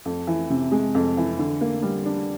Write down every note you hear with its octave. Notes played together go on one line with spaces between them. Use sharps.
F2
E3
C3
G#3
F2
E3
D3
A#3
G3
D4